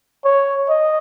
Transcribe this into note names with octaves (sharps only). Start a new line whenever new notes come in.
C#5
D#5